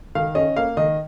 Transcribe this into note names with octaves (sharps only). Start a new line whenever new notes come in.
D#3 F5
C#4 D#5
A#3 F5
D#3 D#5